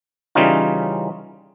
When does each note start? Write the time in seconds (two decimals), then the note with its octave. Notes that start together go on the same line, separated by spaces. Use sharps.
0.35 C#3 E3 G3 C#4 D#4 F4